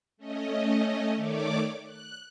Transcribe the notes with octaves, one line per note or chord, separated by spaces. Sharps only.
A3 C#4 D#5
D#3 A3 C#5 D5 D6
F#6